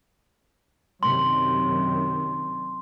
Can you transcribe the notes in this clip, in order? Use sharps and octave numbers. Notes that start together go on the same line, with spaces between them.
F#2 C3 D#3 C6